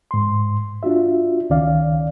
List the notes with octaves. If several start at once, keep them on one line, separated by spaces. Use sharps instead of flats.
G#2 C6
D4 F4 F#4 E5
C#2 D#3 C#4 D5 F5